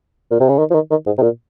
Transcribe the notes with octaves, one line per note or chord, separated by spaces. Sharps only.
A#2
C3
C#3
D#3
F3
D#3
D#3
G#2
C3
A#2